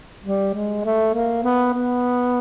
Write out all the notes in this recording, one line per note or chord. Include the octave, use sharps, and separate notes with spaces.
G3
G#3
A3
A#3
B3
B3